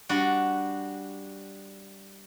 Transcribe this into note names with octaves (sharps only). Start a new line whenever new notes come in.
G3 D4 F#4